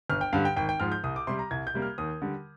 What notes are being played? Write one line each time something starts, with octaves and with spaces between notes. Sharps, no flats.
G1 F6
G5
G2 D3 G3 F5
G5
G#1 G5
G5
G#2 F3 F6
G6
C2 D#6
D6
C3 G3 C6
A#5
C2 G#6
G6
C3 G3 A#3
F6
D#2 D#6
D3 G3